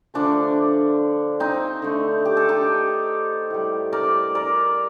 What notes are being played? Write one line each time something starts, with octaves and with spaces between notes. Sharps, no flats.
D3 F3 A3 D4
C4 D#4
D3 A3
G4
A4
D#4 G4
A2 G3
A#4 D5
A#4 D5